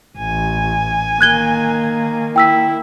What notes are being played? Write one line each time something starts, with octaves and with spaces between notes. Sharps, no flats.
A1 G#5
D#3 A#3 F#6 G#6 G7
E4 G5 E6 B6